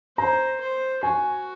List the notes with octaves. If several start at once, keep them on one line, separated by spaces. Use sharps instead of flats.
C5 A#5
C5
F#4 G#5